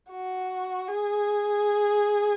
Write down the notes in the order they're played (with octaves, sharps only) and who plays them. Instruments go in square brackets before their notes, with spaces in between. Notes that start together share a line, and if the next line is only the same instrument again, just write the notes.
[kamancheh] F#4
G#4